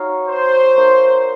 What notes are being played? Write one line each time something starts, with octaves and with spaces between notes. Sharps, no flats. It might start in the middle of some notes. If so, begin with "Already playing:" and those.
Already playing: D#4 F#4 C#5 F5
C5
A#3 D#4 A#4 C#5